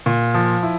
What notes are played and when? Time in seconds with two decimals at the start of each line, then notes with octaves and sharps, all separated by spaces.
0.06 A#2
0.34 F3
0.63 E4